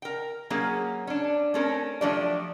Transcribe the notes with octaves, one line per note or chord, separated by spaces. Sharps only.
A#4 G5
F#3 A#3 C#4 G#4
C#4 D4
A3 C4 C#4 A4 A#4
F3 F#3 A3 D4 G4 D5